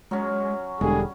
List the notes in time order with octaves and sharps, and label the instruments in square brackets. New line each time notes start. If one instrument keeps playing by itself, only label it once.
[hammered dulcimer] F#3 C#4 [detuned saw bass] G#3
[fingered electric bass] E1 [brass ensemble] D3 G3 G#4 [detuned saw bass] G#3